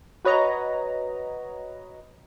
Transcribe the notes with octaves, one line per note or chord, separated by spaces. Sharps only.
F#4 B4 C#5 D#5 A#5